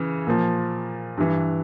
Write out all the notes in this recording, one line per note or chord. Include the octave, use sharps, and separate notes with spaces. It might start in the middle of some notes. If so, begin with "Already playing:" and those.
Already playing: C#3 E3
A#2 F3
G2 E3